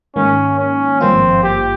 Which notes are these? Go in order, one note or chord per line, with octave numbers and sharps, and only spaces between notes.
G#2 D#3 A#3 C#4
C#4
G#1 G2 F3 A#3 C4 F4
G4